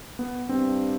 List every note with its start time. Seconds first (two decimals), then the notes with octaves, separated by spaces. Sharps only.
0.19 B3
0.49 G2 C4